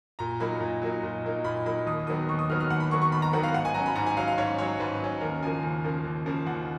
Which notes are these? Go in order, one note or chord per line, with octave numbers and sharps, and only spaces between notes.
A#2 A#5
F#3 A#3 D#4 B5
A#2
F#3 A#3 D#4
A#2
F#3 A#3 D#4
A#2 B5
F#3 A#3 D#4 B5
D#2 D#6
D#3 F#3 B3 D#6
D#2 C#6
D#6
D#3 F#3 B3 F6
F6
D#2 F#5
B5
D#3 F#3 B3 C#6
C#6
D#2 B5
A#5
D#3 F#3 B3 F#5
F5
G#2 F#5
G#5
F#3 C#4 A#5
B5
G#2 A#5
G#5
F#3 C#4 F5
F5
G#2 C#5
F#3 C#4 C#5
G#2 B4
F#3 C#4
D#2 A#4
C#3 F3 A#3 G#5
D#2
C#3 F3 A#3
D#2
C#3 F3 A#3
D#2 F#5